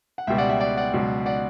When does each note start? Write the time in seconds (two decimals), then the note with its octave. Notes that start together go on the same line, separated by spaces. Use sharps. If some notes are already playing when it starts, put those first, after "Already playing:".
0.18 F#5
0.27 C#2 B2 G3 E5 G5
0.38 D5 F#5
0.49 E5 G5
0.60 D5 F#5
0.77 D5 F#5
0.93 C#2 B2 F#3
1.26 D5 F#5